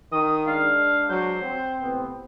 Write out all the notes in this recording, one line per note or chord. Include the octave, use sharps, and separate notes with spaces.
D#3 D#6
G#3 D4 F5
F#3 C5
C4
A2 C3 B3